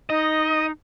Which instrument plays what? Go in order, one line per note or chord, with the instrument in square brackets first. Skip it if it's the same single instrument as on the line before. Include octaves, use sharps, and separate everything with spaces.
[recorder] D#4 [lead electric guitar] D#5